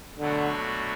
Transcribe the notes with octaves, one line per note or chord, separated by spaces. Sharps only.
B2 D3 F#3 A3 D4 F#4